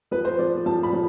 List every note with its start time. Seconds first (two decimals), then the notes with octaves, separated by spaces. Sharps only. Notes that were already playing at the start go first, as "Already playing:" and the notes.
0.11 F3 B4
0.25 C5
0.38 F3 D5
0.66 F3 A5
0.83 B5
0.93 F3